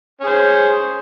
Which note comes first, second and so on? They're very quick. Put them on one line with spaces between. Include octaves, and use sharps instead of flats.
C#4 G#4 C5